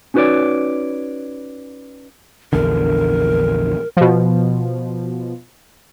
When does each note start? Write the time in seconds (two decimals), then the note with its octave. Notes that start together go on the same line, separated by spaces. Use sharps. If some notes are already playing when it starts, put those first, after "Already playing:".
0.14 C#4 D#4 F#4 B4 C#5 D5
2.53 A#1 E2 D3 A#4
3.97 B2 F3